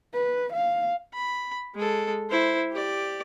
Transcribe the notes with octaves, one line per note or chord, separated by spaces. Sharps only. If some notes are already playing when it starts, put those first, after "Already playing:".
B4
F5
B5
G#3 A4
E4 C5
G4 D5